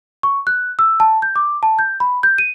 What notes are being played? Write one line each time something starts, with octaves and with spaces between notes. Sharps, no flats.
C#6
F#6
E6
A5
G6
D6
A5
G6
B5
G6
D#7